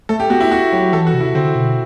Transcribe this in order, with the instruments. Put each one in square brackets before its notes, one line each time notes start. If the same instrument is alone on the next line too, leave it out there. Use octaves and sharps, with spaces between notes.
[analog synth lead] A3 [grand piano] A4
[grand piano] G4
[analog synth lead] B3 [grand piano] F#4
[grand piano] E4
[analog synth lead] A3 [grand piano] F#4
[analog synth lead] F#3 [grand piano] G4
[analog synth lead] E3 [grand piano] A4
[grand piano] F#4
[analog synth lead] C3
[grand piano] E4
[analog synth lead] D3 [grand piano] C4
[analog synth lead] B2